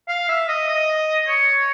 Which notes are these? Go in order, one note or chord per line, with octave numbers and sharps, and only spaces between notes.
F5
E5
D#5
D#5
C#5